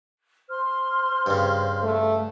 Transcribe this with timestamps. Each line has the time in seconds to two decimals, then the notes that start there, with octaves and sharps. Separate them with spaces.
0.49 C5 C6 F6
1.26 G2 C#3
1.83 A3